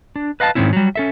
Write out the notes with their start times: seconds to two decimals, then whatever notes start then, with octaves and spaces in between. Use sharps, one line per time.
0.16 D4
0.40 B4 D#5 F5 G#5 A5
0.55 G#2 D#3 G3 C4 C#4 E4
0.73 F#3 G3
0.96 C#4 A4 E5